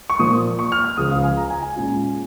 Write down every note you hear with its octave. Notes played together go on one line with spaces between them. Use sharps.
C#6
A#2 F3 A#3 D#6
C#6
F6
F6
C#2 C#3 F3 D#6
F5
G#5
A#5
G#5
G#5
A#2 G#3 C#4 F4